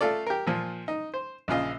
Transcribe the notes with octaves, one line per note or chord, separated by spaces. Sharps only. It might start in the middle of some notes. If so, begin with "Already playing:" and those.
A3 F4 A4 D5
G4 A#4
A#2 F3
D#4
C5
A#1 C#3 F4 D#5